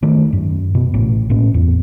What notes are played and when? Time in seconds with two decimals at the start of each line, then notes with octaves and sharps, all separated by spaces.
0.03 D#3 A3
0.33 F#2
0.75 B2
0.94 A1
1.29 A2 A#3 C#4
1.54 E2